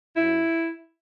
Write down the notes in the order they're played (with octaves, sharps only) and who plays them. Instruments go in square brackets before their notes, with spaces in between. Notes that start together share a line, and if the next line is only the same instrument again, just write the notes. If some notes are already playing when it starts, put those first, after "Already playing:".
[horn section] F#2 F#3 E4